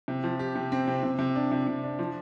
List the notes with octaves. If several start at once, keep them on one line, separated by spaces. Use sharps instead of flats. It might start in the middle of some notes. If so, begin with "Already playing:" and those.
C3
F3
G4
C3
C4
C3
C3
C3
D4
C3
C3
D4
F3